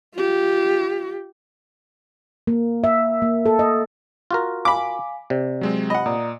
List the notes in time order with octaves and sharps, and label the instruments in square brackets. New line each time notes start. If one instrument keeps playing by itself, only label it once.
[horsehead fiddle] F4 G4
[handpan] A#3
E5
A#3
A4
D#5
[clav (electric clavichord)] F4 F#4 A#4
[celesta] F5 G#5 [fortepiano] B5 D6
[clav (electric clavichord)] C3 [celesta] D5
[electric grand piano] F#3 G#3 C4
[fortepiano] D#5 F#5 [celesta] B5
[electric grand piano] A#2 [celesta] D5 A#5 D#6